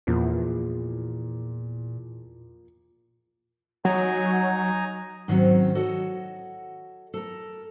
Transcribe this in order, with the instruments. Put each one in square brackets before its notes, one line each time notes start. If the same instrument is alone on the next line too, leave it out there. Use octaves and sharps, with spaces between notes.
[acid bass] E2 [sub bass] A#2 [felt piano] F3 A#3
[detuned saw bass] F#3 [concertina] D#4 G#5 A#5
[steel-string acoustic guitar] G#2 D#3 F#3 C4 C#4
F#4 A4 C#5 D#5 F#5
A4 A#4